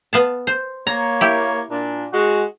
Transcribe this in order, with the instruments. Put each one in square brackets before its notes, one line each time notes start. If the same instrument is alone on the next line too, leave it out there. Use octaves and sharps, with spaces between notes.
[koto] B3 F5 A5
C5
[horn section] A#3 C#5 [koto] A#5
[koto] E4 G4
[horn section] A#2 D4
G#3 F#4